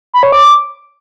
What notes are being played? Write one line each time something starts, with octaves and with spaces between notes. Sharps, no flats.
B5
C#5
D6